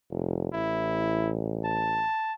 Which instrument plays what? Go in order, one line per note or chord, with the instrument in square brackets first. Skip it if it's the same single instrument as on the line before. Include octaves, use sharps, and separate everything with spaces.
[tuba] F1
[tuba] A1 [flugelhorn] E4
[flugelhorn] A5